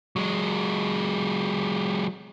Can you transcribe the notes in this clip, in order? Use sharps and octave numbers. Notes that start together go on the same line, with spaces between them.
F#3 G#3